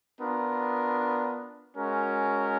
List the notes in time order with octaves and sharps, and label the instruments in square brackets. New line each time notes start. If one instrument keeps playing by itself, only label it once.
[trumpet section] B3 D4 F4 A#4
G#3 C#4 F#4 A#4